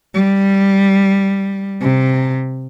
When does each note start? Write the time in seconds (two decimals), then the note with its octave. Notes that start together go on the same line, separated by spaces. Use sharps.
0.14 G3
1.81 C3